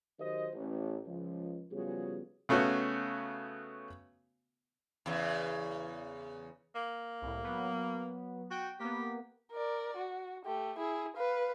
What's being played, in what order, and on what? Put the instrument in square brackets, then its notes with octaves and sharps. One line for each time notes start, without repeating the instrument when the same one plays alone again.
[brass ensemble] D#3 F#3 G4 C5 D#5
A1
C#2 F3
C#3 F3 G3 B3 F#4 G#4
[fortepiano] C#3 A3 B3 C#4 F#4
[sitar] E2 C#3
[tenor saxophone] A#3
[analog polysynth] C2 A2
F#3 B3
[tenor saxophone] F#4 [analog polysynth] G5
[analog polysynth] A#3 B3 [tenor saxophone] G4
[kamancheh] A#4 D5
F#4
A3 G4
E4 G#4
B4 F5